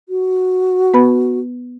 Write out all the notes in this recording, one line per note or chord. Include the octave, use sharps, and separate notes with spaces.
F#4
B3 B4 B5